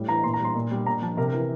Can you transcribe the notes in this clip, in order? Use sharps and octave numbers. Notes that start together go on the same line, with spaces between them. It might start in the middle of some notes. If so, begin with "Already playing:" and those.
Already playing: A2 G3
E3 A#5
A#2 C6
A#5
G3 C6
A#2
G3
A#2 A#5
F3 A5
C3 A#4
A#4
E3